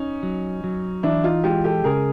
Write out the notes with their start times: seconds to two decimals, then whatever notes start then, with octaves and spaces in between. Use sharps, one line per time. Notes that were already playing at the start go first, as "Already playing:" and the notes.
Already playing: C#4 D#4
0.23 F#3
0.64 F#3
1.03 E3 D4 E4
1.24 D#4 F4
1.44 G#3 F4 G4
1.64 G4 A4
1.84 C#3 G#4 A#4